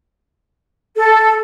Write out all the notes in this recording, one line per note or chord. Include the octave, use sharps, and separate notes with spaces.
A4